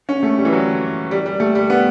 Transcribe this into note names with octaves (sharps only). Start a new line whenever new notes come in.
C#4
A3
G3
E3
F#3
G3
G3
A3
G3
B3